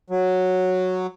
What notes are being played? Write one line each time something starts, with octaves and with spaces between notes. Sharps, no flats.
F#3